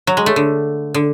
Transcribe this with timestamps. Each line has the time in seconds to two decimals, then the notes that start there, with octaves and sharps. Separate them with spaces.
0.07 F#3
0.17 G#3
0.26 A3
0.36 D3
0.94 D3